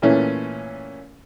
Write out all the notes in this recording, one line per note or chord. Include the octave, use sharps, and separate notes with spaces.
A#2 E3 A3 C#4